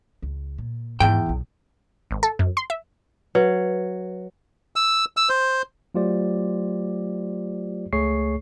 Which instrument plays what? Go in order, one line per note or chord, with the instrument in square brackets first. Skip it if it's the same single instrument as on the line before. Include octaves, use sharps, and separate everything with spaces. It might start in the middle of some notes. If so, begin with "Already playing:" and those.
[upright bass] C#2
A#2
[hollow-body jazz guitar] E2 G5 [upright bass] G#2 D#3
[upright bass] F#1 B1
[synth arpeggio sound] G#1
A4
F#2
C6
E5
[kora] F#3 [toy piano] B4
[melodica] E6
E6
C5
[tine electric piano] F#3 A3 F4 G4 C5 D5
C#2 A3 G#4 C#5 C#6 C7